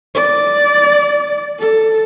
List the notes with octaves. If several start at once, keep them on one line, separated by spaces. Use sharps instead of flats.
D5
A4